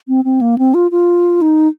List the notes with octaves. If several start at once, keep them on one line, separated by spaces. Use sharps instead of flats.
C4
C4
A#3
C4
F4
F4
D#4